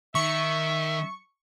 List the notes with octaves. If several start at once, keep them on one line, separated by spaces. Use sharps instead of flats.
D#3 E5 C#6